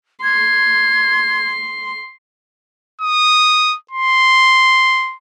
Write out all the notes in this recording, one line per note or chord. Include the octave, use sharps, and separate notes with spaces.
C6 G#6
D#6
C6